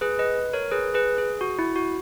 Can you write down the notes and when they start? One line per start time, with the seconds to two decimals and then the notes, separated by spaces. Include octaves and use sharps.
0.01 G#4 B4
0.19 B4 D#5
0.53 A#4 C#5
0.71 G#4 B4
0.94 G#4 B4
1.18 G#4
1.41 F#4
1.59 E4
1.76 F#4